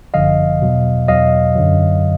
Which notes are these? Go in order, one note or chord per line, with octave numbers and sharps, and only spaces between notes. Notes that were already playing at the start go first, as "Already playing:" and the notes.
G1 F#2 D3 F3 D#5 F5
E2 B2 F#3
E2 B2 F#3 D#5 F5
F#2 D3 F#3